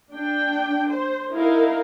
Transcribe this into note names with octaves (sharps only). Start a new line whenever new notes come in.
D4 G5
C5
D#4 E4 A#4 F5